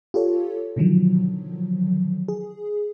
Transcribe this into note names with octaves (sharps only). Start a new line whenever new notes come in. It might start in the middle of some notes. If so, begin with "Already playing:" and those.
F4 G4 A4 C#5
B2 D3 D#3 F3 F#3
G#4